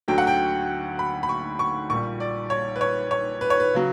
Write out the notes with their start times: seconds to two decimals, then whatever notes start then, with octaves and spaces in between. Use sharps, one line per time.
0.08 D2 D3 F#3 G5
0.18 F#5
0.27 G5
0.99 B5
1.23 B5
1.29 C#6
1.59 C#6
1.90 A#1 A#2 G3 C#6
2.20 D5
2.50 C#5
2.76 B4
2.81 C#5
3.11 C#5
3.41 B4
3.50 C#5
3.60 B4
3.74 C#3 F#3